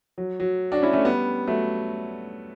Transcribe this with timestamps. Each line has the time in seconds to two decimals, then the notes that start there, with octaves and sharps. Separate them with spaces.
0.18 F#3
0.40 F#3
0.72 D4 F#4
0.82 C#4 E4
0.93 A3 C#4
1.05 G3 B3
1.47 F#3 A3